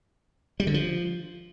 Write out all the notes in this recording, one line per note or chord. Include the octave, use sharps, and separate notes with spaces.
G3
D3
F3